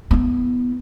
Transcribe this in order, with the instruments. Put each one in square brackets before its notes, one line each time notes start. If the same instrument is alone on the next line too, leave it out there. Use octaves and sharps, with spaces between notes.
[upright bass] B3 E4